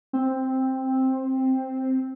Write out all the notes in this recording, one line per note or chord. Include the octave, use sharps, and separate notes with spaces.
C4